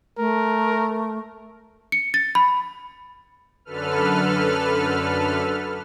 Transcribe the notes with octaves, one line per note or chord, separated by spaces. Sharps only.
A3 A#4
C#7
A6
B5
F#2 D3 A4 B4 F6